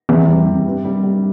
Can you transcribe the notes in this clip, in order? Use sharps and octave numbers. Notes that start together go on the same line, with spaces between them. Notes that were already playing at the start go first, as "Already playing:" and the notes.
E2 C3
G3
C3
G2
G3
G3